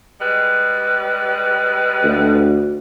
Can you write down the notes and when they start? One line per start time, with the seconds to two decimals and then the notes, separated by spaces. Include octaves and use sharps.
0.19 G3 G#3 B4
2.03 D2